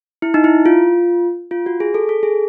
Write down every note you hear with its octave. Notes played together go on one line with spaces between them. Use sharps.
E4
D#4
E4
F4
F4
F#4
G#4
A4
A4
G#4